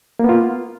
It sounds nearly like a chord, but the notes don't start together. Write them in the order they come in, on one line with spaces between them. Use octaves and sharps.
A#3 B3 F4